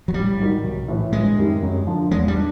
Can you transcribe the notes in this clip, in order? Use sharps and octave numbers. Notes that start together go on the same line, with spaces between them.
F#3
A1 G3
G#2 D#3 F#3
B1
A2 E3
G1 G#3
F#2 D#3 G3
F#2
D3 F3
E2 G#3
G3
D4